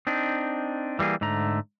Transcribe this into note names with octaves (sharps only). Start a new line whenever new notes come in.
C4 D4 D#4
E3 G3 A#3 G#4
G#2 D3 A3 A#5